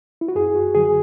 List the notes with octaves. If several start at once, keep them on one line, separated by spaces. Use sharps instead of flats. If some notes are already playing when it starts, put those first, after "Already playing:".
E4
F#4
F#2 G#4
F#4
D3 F#3 G#4